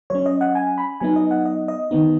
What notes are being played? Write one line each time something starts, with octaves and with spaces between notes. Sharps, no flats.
F#3 C#4 C#5
D#5
F#5
G#5
B5
F#3 B3 D#4 G#5
D#5
F#5
D#5
D#5
D#3 B3 D#4